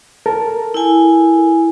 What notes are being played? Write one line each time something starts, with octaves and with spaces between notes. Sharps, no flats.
A4 A#4 A5
E4 G#5